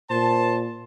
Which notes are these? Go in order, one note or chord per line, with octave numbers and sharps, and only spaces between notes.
A#2 C5 A5